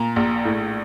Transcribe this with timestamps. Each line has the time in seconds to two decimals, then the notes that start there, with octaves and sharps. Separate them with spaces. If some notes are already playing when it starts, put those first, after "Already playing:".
Already playing: A#2 A#5
0.16 A#1
0.45 A2